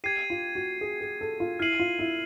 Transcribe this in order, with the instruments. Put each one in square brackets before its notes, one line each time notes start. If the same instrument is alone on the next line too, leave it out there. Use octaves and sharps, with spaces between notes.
[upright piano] G4 [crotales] G#6 C7 D#7
[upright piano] F4
F#4
G#4
G#4
A4
F4
[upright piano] E4 [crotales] F6 G#6 C7 D#7 F#7
[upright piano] F4
E4